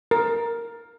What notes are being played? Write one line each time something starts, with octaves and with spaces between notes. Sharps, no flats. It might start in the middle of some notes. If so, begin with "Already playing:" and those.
A#4